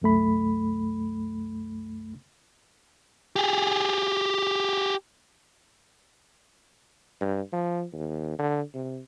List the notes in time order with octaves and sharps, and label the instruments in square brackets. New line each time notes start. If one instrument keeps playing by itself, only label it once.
[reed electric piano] C2 F#2 A3 B5
[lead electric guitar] G4 G#4
[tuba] G2
F3
D#2
D3
C3